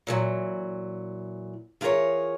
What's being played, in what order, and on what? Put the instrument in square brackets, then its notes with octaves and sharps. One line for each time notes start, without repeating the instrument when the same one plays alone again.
[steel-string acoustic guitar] A#2 E3 F#3
E3 F4 G#4 A#4 C#5